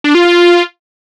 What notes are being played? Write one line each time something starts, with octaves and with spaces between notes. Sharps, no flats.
D4
F4
F4